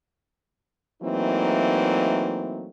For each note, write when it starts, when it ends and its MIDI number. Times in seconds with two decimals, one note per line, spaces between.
1.03 2.70 52
1.03 2.70 54
1.03 2.70 57
1.03 2.70 58
1.03 2.70 60
1.03 2.70 63